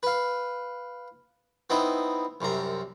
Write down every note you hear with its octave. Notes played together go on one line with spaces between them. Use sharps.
B4 F5
B3 C4 D#4 E4 D#5
C2 F#2 C3 A#5